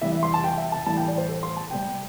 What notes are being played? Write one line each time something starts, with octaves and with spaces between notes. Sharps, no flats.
C3 E3 G3 E5
E5
C6
A5
G5
E5
A5
A2 E3 G3 A5
G5
D5
C5
A4
C6
A5
C3 G3 G5